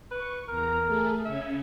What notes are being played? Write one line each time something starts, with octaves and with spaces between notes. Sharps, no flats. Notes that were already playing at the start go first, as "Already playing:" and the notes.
B4 C#6
E2 A#4 A#5
A3 G#4 A4
C#3 C#4 E5 G#6